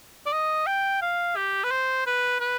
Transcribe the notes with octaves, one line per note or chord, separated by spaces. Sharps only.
D5
D#5
G5
F5
G4
B4
C5
B4
B4